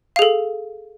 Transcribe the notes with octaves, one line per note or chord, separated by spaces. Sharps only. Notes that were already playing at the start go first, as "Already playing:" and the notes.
G#4 A4 F5